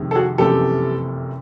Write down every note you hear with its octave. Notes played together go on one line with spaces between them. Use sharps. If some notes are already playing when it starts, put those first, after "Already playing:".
Already playing: F2 C3 D#3 G#3
A4
F#4 G#4
F#1 F2 C3 E3 A3 G4 A4